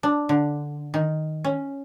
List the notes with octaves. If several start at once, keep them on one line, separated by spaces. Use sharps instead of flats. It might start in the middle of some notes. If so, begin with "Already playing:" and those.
D4
D3
D#3
C#4